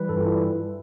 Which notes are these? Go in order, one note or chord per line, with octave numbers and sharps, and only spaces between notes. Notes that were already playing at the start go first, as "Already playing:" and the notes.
Already playing: E3 G3 B4
G2 A4
F4
E3 G3 E4